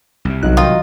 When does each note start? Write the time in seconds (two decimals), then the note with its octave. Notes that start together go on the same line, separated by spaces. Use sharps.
0.25 C2 C3
0.43 B1 F#3 D#4 F#6
0.57 D#3 F4 D#5